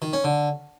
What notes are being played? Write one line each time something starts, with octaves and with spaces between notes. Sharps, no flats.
D#3
C#4
D3